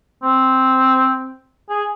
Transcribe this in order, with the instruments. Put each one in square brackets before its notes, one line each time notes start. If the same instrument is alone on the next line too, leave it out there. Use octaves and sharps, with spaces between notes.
[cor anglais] C4
G#4